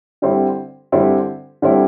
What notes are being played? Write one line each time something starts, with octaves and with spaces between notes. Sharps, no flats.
D3 G3 C4 E4
D3 G3 C4 E4
D3 G3 C4 E4